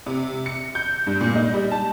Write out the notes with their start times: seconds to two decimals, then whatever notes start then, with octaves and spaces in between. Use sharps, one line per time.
0.06 C3
0.46 C#7
0.75 G6
1.07 G2
1.21 A#2
1.36 D#4
1.54 G3
1.72 A5